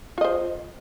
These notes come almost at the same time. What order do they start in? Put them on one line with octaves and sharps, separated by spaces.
F4 D#5 C5